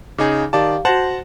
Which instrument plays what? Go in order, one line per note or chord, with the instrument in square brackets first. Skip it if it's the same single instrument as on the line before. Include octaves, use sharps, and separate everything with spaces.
[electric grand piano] C#3 D#4 G#4 [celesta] D6
[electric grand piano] D#3 D5 A5 [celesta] G4 F5 D6
[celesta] F#4 A#6 F#7 [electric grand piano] C5 F#5 A5